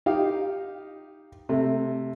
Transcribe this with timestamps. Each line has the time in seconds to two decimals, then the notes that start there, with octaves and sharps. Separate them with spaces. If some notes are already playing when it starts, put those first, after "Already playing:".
0.06 D#4 G4 F5
1.49 C3 A3